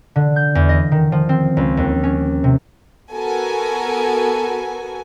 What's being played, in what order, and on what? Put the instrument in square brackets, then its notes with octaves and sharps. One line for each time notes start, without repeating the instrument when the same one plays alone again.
[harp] D3
G6
E2
D#5
D#3
F3
C4
C#2
D#2
C#4
C3
[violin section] B3 F#4 A4 A#4 G#5